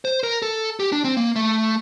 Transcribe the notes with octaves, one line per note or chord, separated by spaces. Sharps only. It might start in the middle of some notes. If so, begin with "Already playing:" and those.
C5
A#4
A4
G4
D4
C4
A#3
A3